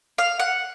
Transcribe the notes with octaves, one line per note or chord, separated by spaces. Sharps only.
F5
F#5